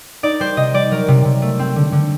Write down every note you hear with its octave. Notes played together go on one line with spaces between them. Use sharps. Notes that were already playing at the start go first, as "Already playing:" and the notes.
D#4 D5
G3 C5
C3 D#5
G3 D5
F#3 A#4
C3
C3
A3
C4
D3
D3